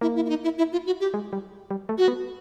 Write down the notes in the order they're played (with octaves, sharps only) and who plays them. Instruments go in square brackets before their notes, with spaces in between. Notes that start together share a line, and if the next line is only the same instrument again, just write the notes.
[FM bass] A#3 [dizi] E4
[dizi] E4
E4
D#4
E4
E4
F4
F#4
G4
[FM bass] G#3
G3
G3
A3
[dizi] F#4
[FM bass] B3